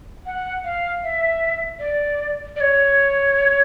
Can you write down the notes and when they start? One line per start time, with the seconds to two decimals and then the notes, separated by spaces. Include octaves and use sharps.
0.26 F#5
0.64 F5
1.04 E5
1.79 D5
2.56 D5
2.61 C#5